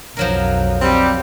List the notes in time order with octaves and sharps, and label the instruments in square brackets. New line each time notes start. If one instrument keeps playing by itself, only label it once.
[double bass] B1 F2 [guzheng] F3 F#3 A#4
[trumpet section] G3 [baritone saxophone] C4